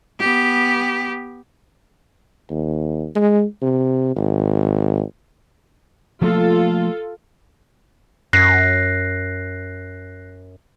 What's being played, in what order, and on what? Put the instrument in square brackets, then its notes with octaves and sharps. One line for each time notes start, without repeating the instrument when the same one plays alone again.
[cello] B3 G4
[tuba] D#2
G#3
C3
G#1
[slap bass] F3 A3 A#3 [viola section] F4 A4
[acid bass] F#2 [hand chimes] F#6 A#6 C7